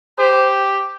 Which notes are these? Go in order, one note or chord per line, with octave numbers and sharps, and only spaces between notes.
G4 C5